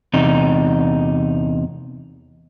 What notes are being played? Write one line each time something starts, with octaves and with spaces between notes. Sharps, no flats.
E2 C3 D#4